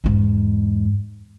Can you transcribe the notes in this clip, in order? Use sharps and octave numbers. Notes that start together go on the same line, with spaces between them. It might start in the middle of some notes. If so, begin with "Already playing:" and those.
E2 G#2